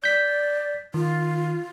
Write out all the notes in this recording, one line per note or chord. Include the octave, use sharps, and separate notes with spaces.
D5 G6 B6
D#3 F4